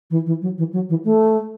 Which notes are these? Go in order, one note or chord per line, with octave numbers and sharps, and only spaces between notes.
E3
E3
F#3
E3
F#3
E3
A3